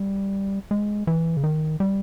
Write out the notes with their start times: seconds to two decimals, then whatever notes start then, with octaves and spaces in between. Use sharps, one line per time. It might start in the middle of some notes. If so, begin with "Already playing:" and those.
Already playing: G3
0.71 G#3
1.07 E3
1.37 C#3
1.44 D#3
1.80 G3